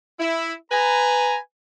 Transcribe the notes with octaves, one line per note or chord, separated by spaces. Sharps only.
E4
B4 G#5 A#5